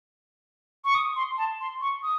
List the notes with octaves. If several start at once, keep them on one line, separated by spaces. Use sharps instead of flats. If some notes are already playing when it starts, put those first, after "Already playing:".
C#6
D#6
C6
A5
C6
C#6
D#6